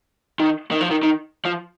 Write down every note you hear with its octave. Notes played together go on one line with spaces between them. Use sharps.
D#3
D#3
F3
D#3
D#3
F3